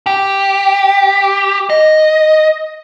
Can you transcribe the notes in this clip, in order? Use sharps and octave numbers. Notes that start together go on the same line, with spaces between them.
G4
D#5